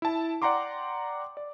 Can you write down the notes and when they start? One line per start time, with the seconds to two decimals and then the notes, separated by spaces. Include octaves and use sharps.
0.02 E4 A5
0.42 D5 F#5 G5 A#5 C6 D6
1.37 D5